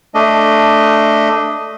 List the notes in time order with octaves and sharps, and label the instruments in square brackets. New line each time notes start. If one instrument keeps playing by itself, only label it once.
[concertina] A3 D4 D#5